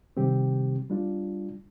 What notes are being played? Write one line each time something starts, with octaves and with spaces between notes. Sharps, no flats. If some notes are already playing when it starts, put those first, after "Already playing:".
C3 D#3 G3 C4 G4
G3 D4 F4